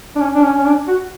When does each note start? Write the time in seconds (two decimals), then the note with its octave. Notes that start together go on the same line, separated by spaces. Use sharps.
0.16 D4
0.21 C#4
0.35 D4
0.43 C#4
0.58 C#4
0.66 D4
0.88 F#4